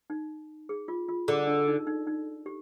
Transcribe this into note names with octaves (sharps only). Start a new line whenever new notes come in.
D#4
G#4
F4
F4
D3 G#4
D4
D#4
D#4
D#4
G4